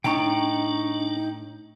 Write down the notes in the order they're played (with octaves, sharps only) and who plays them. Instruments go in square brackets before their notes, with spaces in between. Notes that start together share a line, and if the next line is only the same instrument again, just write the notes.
[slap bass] A2 [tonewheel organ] D4 [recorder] D#4 [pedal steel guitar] G5 A#5 C#6